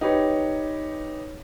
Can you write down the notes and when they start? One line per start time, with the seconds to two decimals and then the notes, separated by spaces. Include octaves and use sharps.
0.01 D#4 G4 B4 C#5